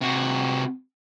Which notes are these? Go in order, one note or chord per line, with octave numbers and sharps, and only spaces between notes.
C3 F#4